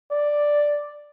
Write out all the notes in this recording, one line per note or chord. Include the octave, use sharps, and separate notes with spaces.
D5